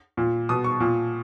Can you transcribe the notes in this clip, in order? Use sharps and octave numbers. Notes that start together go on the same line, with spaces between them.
A#2
B2 D#6
C#6
A#2